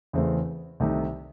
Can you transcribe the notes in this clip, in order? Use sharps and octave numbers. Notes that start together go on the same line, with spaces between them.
E2 C#3 E3 A3 C4
C2 C3 D#3 A3 D#4